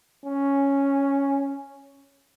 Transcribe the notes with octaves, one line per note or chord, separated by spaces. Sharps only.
C#4